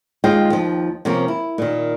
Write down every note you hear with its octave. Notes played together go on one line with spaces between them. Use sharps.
D#2 G#3 F4 D#5 G5
D#2 F3
C3 F3 A#3 C#4
E4
A#2 D#3